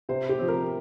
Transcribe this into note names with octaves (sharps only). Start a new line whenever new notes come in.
C3 C5
G4
F3 C4
A#4